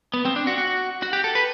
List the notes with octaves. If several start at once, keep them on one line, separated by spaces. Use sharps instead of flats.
B3
C4
D4
F#4
F#4
F#4
G4
A4
B4